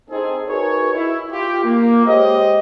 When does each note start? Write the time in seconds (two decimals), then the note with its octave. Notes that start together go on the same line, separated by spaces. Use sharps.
0.10 C4 D#4 G#4 A4
0.48 D#4 F#4 G#4 A#4 B4 C#5
0.94 E4
1.32 F4 G4
1.65 A#3
2.06 G#3 G4 C5 C#5 D#5